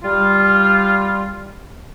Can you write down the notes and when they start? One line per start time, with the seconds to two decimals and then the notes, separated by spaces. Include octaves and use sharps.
0.04 G3 F4